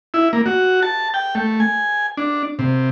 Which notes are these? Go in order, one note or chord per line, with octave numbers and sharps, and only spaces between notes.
E4
A#3
F#4
A5
G5
A3
G#5
D4
C3